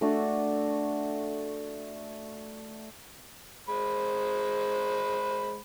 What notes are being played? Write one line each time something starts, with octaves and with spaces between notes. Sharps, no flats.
A3 D4 F#4 A4
G#3 C5 B5